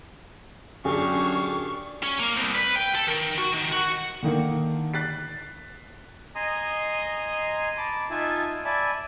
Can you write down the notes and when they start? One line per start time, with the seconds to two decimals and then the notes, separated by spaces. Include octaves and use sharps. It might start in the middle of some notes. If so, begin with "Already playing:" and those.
0.85 F#2 D3 D4 G4 G#4 F5 C#6
2.03 C#4
2.20 A#3
2.36 C2
2.55 B4
2.76 G5
2.95 A4
3.08 D#3
3.38 F#4
3.53 D#3
3.72 F#4
4.23 D3 D#3 A#3
4.94 F#6 A6 B6 C7
6.35 D#5 G#5 A#5 C6 D#6
7.78 A5 B5 D6
8.10 D#4 F4 E5 G#5 A5
8.65 D5 E5 G#5 A5 B5